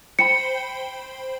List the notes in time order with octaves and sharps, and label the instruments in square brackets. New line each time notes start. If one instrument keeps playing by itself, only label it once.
[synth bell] C5 G5 B5 [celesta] C#7